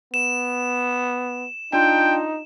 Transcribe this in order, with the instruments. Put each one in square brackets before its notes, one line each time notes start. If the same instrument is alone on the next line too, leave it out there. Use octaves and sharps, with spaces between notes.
[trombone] B3 [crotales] E7
[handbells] D4 F4 G6 [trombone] D#4 [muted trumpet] G5